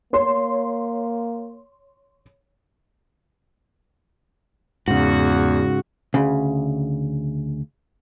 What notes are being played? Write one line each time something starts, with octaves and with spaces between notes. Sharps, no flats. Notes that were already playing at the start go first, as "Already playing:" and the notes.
A#3 C#5 C6
E2 G#2 C#3 F#4
D2 C#3